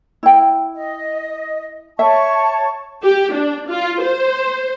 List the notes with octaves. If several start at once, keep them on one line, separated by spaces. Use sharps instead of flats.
E4 G5
D#5
C#5 E5 A5 C#6
G4
D4
F4
C5